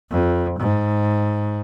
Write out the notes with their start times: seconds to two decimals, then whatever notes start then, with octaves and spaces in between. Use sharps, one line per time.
0.11 F2
0.59 G#2